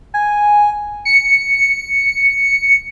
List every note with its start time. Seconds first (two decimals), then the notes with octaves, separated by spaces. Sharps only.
0.14 G#5
1.05 C#7